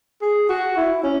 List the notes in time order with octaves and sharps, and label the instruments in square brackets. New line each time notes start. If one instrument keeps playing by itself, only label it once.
[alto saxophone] G#4
F#4
E4
C#4